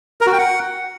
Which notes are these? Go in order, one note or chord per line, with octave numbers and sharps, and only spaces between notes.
A#4
F#4
G5
F#5